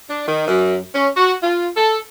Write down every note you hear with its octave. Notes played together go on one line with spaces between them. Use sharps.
D4
D#3
F#2
C#4
F#4
F4
A4